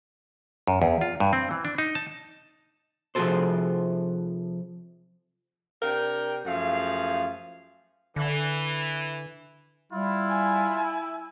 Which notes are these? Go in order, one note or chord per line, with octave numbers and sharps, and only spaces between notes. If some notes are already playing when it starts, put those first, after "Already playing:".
F#2
E2
F4
G2
C4
E3
D4
D#4
A5
C3 F3 F#4 G#4 A4 C5
C3 D4 A#4 G5
F#2 F3 A3 G#4 F5
D3 E3
G3 E4 F4
G#5